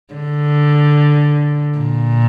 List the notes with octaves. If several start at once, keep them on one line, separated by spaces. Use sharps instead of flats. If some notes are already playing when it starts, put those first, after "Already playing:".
D3
A#2